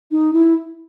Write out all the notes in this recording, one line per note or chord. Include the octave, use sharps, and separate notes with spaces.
D#4
E4